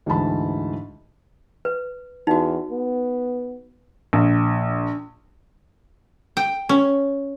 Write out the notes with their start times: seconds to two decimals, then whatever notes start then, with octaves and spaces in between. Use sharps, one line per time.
0.06 D2 G#2 E3 A5 B5
1.65 B4
2.27 E2 D#4 F#4
2.71 B3
4.13 A#1
6.37 G5
6.69 C#4